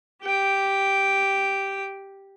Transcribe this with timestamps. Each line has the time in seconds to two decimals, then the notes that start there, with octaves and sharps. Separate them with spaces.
0.24 G4 G5